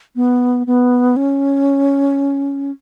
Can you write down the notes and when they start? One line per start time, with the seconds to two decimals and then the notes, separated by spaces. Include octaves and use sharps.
0.16 B3
0.67 B3
1.16 C#4